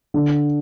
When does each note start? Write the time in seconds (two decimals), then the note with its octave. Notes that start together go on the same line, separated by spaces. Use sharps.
0.14 D3